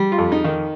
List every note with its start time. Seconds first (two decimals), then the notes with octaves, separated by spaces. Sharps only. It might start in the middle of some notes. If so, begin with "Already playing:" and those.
Already playing: G3
0.12 F4
0.18 F2
0.32 D#4
0.44 D#3